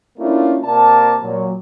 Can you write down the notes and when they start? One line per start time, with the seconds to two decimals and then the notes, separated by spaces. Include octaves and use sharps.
0.18 A3 A#3 C#4 D4 E4 F4
0.63 C3 A#3 D5 A5
1.22 A#2 F#3